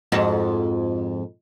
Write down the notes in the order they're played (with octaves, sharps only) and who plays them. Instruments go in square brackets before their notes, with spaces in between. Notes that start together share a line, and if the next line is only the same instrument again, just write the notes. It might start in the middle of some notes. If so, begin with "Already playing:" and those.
[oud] F2 G#2 F#4